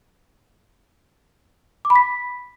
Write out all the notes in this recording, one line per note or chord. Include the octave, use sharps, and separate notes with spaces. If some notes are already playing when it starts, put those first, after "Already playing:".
D6
B5
B6